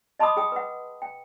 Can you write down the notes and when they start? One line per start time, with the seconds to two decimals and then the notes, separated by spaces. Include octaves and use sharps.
0.20 D#5 A5 B5 C6 D6 D#6
0.37 G#4 G5 D#6
0.52 B4 F#5
1.02 G5